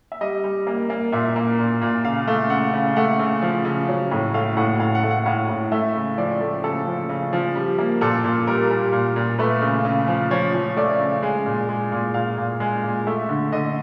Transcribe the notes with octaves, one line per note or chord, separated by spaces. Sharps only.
E5
G3 D#5
G3
A#3
A#3
A#2 E5
A#3
A#2
A#2
C#3 F5
A3
C#3 F#5
C#3
A3 F#5
C#3
F3
C#3
F#3
A2
A3 F5
A2 F#5
A2 F5
F#5
A3
F#5
A2 F5
A2
A3 E5
C#3
F3 D5
A3
C#3 A4
F3
C#3
F3
G3
A#3
A#2 A4
A#2
G3 A#4
G3
A#2
A#2
A3 B4
C#3
C#3
F3
F3 C#5
F3
A3 D5
C#3
G#3
A#2
G#3
A#2
A#2 F5
A#2
G#3
A#2
A3 E5
D3
D3 D#5